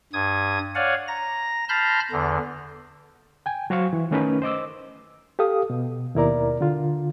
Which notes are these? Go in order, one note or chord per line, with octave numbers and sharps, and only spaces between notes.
G2 D#6 G#6
C#5 D5 F5 F#5 G#5
A#5 A#6
A5 B5 C6 F6 G6 A#6
E2 D3
G5 G#5
F#3 F#4 C5 F5 C#6
E3
D#3 A3 C#4 D#4 A#4 B4
C5 D#5 D6 E6
G4 A4 F5 D#6
B2
D#2 B2 E4 A#4 D5 A#5
D3 F4